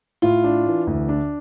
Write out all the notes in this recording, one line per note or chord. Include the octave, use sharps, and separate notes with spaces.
A2 F4
D4
E3
D2
D4